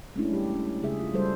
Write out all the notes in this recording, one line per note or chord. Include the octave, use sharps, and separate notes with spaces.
G#3 A3 C#4 D4 E4
G3 G4
A3 C#4
C#3 G#3 G#4 E5
F4
G3 G#3 A4 C5